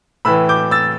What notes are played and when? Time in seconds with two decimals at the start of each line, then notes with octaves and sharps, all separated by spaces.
0.25 A2 E3 B5 E6
0.49 D6 G6
0.71 E6 A6